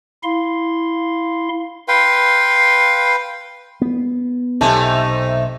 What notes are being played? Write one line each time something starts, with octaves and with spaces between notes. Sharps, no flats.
E4 F5 C6
B4 F5 G5 C6
B3
B1 C3 A3 D#4 E5 G#5 A5